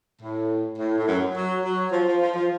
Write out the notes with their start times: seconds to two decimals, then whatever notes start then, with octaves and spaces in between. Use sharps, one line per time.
0.21 A2
0.79 A2
0.98 A2
1.08 F#2
1.35 F#3
1.64 F#3
1.92 F3
2.06 F3
2.21 F3
2.36 F3